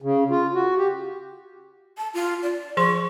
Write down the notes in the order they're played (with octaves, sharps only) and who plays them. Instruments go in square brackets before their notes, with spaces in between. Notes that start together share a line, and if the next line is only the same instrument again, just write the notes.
[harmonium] C#3
F4
F#4
G4
[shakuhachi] A5
F4
D5
[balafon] F3 G#4 C6 [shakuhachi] C#6